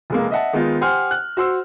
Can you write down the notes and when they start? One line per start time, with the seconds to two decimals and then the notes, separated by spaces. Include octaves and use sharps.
0.10 F1 G#3 A#3
0.31 D#5 E5 F#5 A5
0.53 D#3 G#3 B3 D#4 F4
0.81 G4 C5 F#5 G#5 C6 F6
1.11 F#6
1.37 F#4 C5 C6 E6